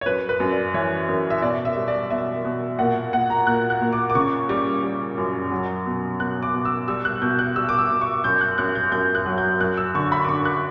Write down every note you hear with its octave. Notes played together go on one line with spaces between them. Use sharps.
C#5
F#2 B4
B4
F#2
D5
E3 C#5
F#2
E5
B2 D5
E5
G3
D5
B2 E5
B2
A#2 F#5
A#2 F#5
A#5
A#2 F#6
F#6
A#2
D6
D6
C#3 C#6
G3 D6
G3
F#2
F#3
B2
B2 F#6
D6
B2
E6
G3 E6
F#6
B2 G6
F#6
G3 E6
D6
E6
B2
C#6
F#2 G6
F#6
F#2 F#6
G6
F#2 G6
F#6
F#3
G6
F#2 F#6
E6
D3 C#6
B5
D6
D3 C#6
F#6